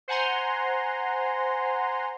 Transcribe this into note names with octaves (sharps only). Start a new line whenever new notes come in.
C5 F#5 G#5 A#5 C6